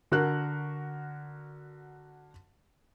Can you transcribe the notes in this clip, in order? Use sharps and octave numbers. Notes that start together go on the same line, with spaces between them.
D3 F#4 A#4 F#6